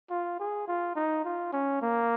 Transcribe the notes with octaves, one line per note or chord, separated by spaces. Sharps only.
F4
G#4
F4
D#4
F4
C#4
A#3